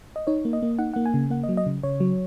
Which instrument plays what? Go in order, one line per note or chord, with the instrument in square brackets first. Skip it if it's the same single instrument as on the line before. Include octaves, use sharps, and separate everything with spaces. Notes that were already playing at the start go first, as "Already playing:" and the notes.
[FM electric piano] D#5
D#4 C#5
A#3
D#5
A#3
D#4 F#5
A#3 F#5
G#5
C#3
A#3 F#5
D#5
F#3
D#5
C#3
C#3 C#5
F#3